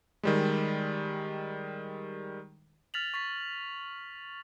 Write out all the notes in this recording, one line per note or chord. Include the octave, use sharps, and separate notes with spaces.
D#3 G3 G#3
F6 A6 B6 F7 F#7
C#6 A6 B6